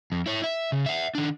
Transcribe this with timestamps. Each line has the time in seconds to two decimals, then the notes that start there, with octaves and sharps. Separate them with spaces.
0.12 F2
0.26 E4 C#5
0.44 E5
0.72 C#3
0.86 E5 F#5
1.15 D#3 D4